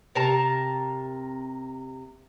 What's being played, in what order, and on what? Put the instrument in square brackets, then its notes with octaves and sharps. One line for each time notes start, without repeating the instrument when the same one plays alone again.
[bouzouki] C3 A#4 A5 A#5